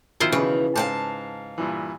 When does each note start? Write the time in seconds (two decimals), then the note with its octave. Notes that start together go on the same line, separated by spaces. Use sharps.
0.20 B2 D#3 F3 E4 F4 C5
0.32 C#3 E3
0.76 G#2 F5 G5 A5
1.58 G2 A#2 E3